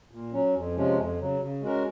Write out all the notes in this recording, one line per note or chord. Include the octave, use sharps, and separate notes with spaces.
A#2
F#3 C#4
F2
C3 F3 G#3 C#4
F2
C#3 F#3
C#3
G#3 C#4 F#4 A#4